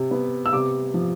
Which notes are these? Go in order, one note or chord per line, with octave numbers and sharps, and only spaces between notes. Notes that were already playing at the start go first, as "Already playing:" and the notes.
Already playing: C3
B3
E6
C3 D6
F3